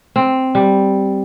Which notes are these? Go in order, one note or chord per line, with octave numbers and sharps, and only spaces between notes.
C4
G3